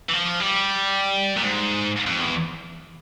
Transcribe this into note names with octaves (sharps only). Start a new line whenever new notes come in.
E3
F3
G3
A#2
G#2
F2
E2